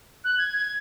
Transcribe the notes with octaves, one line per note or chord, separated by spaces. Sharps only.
F#6
G#6
G#6